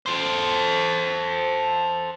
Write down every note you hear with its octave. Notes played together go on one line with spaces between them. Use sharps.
A4 C5